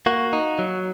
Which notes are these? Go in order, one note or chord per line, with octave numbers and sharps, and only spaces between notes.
A#3 F#4
D#4
F#3